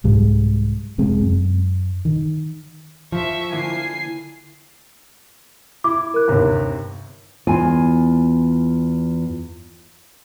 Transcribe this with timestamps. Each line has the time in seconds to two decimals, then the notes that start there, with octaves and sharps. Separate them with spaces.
0.04 C2 G#2 G3 G#3
0.98 F1 C3 G#3 C4
1.21 F#2
2.05 D#3
3.12 F3 E5 C#6
3.52 D3 A#3 E4 G#5 C7
5.84 E4 D6
6.14 A#4 F#6
6.28 G1 D#2 C3
7.47 E2 F4 G#5